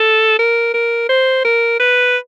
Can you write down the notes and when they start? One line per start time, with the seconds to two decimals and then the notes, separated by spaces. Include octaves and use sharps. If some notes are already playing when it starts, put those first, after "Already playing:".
Already playing: A4
0.39 A#4
0.74 A#4
1.09 C5
1.44 A#4
1.80 B4